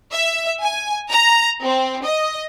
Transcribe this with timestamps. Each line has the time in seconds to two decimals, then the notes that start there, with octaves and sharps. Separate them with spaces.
0.12 E5
0.61 G#5
1.10 A#5
1.63 C4
2.06 D#5